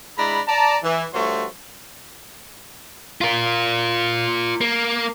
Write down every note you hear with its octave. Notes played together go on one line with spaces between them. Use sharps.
G#3 D4 E4 A#5 B5
D5 A5 A#5
E3
G2 F3 A3 F#4 C#5 C6
F4 A#4
A#3